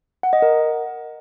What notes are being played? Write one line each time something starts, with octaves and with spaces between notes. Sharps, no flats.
F#5
D#5
A#4